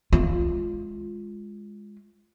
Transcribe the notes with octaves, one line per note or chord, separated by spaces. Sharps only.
G#3 F4